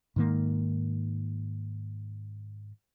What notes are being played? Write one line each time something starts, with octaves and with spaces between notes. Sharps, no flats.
G#2 D#3 A#3